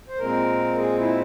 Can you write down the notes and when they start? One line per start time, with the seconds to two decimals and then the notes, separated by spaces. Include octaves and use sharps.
0.09 C5
0.18 A#2 G#3 C4 A#4
0.78 G#4
0.99 E4